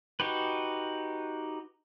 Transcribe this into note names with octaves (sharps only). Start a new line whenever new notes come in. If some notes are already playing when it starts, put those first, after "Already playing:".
D#4 F#4 G4 B4